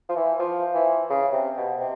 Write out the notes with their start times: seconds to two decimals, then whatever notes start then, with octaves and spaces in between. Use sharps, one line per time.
0.09 F3
0.16 E3
0.39 F3
0.74 E3
1.10 C#3
1.33 C3
1.57 B2
1.80 C3